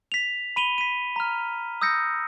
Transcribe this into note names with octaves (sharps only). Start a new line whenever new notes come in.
B6 F7
B5 D#7 F7 G7
B6 D#7
A#5 F6
D#6 E6 G6 A#6 C#7